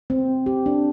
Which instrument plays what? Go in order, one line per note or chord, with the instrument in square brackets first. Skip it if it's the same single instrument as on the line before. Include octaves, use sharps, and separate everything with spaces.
[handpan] C4
G4
D4